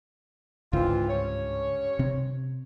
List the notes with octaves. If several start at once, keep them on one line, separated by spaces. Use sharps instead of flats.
C#2 G#2 D3 E3 C4 F4
G2 C#4 C#5
C3 C4